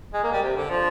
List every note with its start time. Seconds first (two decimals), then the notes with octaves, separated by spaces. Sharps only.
0.14 G#3
0.24 A#3
0.32 G3
0.42 C3
0.56 D3
0.70 F3